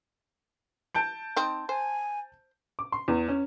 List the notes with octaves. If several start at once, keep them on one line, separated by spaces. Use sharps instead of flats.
A5 G6 D7
C4 D#4
C5 G#5
D6
C6
E2
C#4